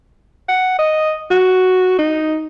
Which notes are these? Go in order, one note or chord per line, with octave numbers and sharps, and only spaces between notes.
F#5
D#5
F#4
D#4